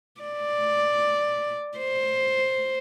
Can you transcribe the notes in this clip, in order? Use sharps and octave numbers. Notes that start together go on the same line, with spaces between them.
D5
C5